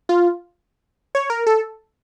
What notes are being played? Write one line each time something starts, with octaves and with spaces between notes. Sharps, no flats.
F4
C#5
A#4
A4